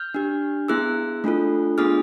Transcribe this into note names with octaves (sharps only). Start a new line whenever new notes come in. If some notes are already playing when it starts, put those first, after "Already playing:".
Already playing: F6 G6
D4 G4
B3 E4 G#4 E6 F#6
A3 D4 F4 A4
B3 D4 F4 G#4 D#6 F6